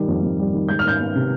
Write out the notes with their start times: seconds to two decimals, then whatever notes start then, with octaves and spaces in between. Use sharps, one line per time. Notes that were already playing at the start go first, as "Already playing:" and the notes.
Already playing: D#3 G3
0.08 F2
0.23 F2
0.39 G3
0.54 D#3
0.69 G#3 G6
0.79 F6
0.84 D#3 G6
1.00 B3
1.15 C3